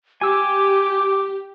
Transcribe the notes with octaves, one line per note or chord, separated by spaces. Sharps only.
G4 G#5 D6 E6